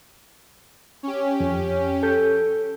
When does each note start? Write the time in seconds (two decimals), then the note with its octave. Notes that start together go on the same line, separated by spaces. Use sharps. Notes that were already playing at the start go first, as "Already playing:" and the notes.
1.03 C#4 G4
1.40 F2
2.03 A4 G6